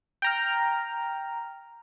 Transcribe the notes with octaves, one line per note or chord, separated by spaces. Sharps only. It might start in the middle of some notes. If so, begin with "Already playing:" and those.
G5 A#5 F6